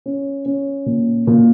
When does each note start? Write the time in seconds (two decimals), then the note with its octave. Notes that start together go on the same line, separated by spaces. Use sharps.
0.06 C#4
0.46 C#4
0.86 A#2
1.27 A#2